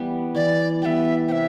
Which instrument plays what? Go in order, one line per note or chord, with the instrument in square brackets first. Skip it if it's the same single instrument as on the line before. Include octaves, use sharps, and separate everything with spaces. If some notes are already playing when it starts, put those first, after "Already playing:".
Already playing: [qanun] E3 G3 B3
[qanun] E3 [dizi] D5
[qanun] G3 B3 [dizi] E5 G5
[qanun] C3 [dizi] E5 G5